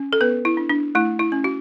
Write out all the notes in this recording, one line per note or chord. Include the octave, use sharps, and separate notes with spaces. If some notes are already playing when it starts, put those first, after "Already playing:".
Already playing: C#4
A4
B3 B4
E4
D4
D4
A3 E4
E4
C#4
F#4